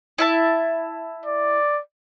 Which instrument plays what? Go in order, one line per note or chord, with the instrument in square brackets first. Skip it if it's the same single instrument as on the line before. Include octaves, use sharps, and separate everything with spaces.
[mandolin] E4 E5 A5
[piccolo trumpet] D5